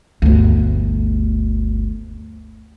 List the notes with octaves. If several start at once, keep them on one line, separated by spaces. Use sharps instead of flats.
G1 D2